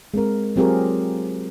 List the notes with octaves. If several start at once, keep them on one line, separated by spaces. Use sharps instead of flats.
G#3 C4 A#4
F#3 C4 F4 G4 G#4 A#4